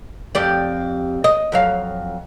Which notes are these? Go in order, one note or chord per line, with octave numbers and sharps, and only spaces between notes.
F2 G4 D5
D#5
F2 F#3 F5